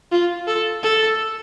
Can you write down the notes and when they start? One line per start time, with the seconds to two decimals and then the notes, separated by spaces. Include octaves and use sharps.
0.12 F4
0.48 A4
0.83 A4